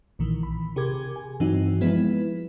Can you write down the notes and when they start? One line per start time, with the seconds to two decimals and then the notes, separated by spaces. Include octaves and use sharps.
0.19 A#1 A#2 D#3 E3
0.43 B5
0.76 C3 G4 G#4 A#4 D6 G#6
1.16 G#5
1.40 G2 E3 F#3 C4 D#4 F#4
1.81 F3 G#3 B3 E4 B4